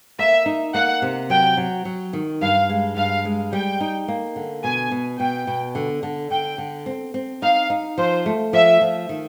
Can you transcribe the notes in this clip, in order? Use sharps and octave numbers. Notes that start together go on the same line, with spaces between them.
A#3 E5
D#4
A#3 F#5
C3
F#3 G5
F#3
F#3
D#3
G2 F5
G#3
G2 F5
G#3
G3 G5
D#4
A#3
D3
B2 G#5
B2
B2 G5
B2
D3
D3
D3 G5
D3
C4
C4
D#4 F5
D#4
F3 C5
A3
F3 E5
F3
D#3